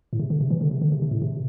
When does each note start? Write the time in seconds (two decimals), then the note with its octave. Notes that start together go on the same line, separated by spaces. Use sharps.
0.13 A2
0.19 C3
0.30 D3
0.41 C3
0.50 E3
0.61 D3
0.71 C3
0.81 D3
0.92 C3
1.02 C3
1.11 A2
1.22 C3